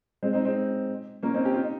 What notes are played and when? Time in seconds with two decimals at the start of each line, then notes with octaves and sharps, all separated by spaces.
0.23 G#3 C4
0.33 C4 D#4
0.45 G#3 C4
1.23 A#3 C#4
1.34 C4 D#4
1.45 G4
1.54 F4
1.63 D#4